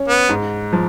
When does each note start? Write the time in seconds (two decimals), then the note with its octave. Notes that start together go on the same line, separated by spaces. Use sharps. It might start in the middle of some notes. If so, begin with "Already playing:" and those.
Already playing: C#4
0.08 B3
0.29 G#2
0.73 F3